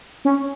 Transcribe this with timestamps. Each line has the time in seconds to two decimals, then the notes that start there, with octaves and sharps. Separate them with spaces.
0.25 C#4